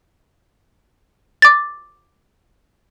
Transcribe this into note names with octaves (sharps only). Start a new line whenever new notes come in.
D6 A6